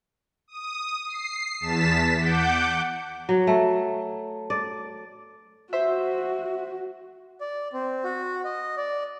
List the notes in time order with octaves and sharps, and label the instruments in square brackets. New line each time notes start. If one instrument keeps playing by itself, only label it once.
[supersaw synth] D#6
C7
E2 A5 B6 E7
F#5 D6 G6
[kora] F#3
A3
D5
[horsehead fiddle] F#4 [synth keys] C5 E5
[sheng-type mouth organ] D5
C4
F#4
D#5
D5